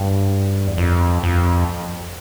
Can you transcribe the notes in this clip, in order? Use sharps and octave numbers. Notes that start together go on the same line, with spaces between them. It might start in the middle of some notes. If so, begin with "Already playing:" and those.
Already playing: G2
E2
F2
F2